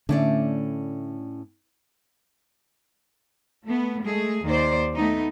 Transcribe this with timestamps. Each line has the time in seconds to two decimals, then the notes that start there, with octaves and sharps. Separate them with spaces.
0.09 A2 D3 A3 C#4 D4 D5
3.65 A3 B3
4.01 G#3 A3 G#4
4.44 D#2 D#3 C5 D5
4.94 A3 B3 D#4